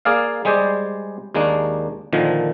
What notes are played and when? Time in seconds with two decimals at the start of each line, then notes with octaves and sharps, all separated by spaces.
0.05 A#3 G#4 D5 F5
0.45 G3 G#3 G#4 C5 D5
1.34 D#2 G#3 A#3 D4
2.13 A#2 D3 D#3 F3